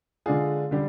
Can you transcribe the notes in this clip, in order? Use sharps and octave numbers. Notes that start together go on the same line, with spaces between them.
D3 G#3 D4 F4 G#4
D3 G3 D4 G4